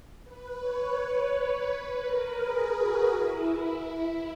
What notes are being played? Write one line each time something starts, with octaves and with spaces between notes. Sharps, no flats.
B4
C#5
C#5
B4
B4
A#4
G#4
F#4
E4